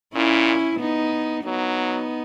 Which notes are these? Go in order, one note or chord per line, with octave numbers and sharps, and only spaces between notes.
A#2 C#4 E4
B3 D#4
F#3 B3 D#4